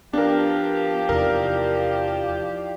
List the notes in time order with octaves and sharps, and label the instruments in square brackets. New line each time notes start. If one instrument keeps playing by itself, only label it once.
[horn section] F3 G4 [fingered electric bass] B3 [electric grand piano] D4 A#4
[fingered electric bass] E2 C3 [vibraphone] D#4 E4 D5 [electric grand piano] A#4